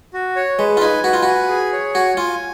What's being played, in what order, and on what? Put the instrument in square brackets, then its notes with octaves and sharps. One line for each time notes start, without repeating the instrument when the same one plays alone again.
[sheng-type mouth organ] F#4
C#5
[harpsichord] G#3 [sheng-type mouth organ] B4
[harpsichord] F4
[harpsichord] D#4 [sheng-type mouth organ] G#5
[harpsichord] F#4 [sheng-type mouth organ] B4
[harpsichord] F4
[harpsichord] F#4 [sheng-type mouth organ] G#5
[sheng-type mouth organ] G#4
C#5
[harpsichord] F#4 [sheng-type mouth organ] G#5
[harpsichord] F4 [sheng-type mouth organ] G#5